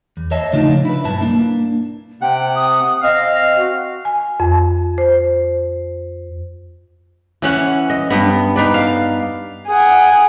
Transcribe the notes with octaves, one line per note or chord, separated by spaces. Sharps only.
E2
C#5 D#5 E5 A5
A2 C#3 F3 D4 D#4 F4
E4 B4
B1 G2 E4 B4 A5
A#3 D4
C3 F#5 G5
D#6
C4 D#5 F5
F#4
G#5
F2
C5
E3 C#4 F#5
D#5
G2 B3
D#4 B4 D5
F5
G#4 F#5